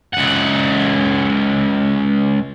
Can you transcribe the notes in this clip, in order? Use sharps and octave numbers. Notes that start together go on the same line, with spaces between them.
C#2 F#5